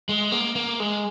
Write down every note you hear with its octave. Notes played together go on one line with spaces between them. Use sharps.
G#3
A#3
A#3
G#3